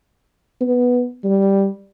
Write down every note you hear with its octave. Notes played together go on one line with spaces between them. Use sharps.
B3
G3